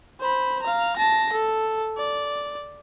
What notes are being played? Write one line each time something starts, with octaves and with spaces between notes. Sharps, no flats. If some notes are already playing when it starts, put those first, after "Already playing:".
C5 B5
F5 A#5
A5 A#6
A4
D5